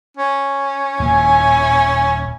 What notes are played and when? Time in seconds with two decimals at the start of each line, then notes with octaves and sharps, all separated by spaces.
0.17 C#4
1.00 D#1 A#2 E4 G#5